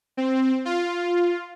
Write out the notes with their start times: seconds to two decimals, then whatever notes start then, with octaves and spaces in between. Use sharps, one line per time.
0.17 C4
0.65 F4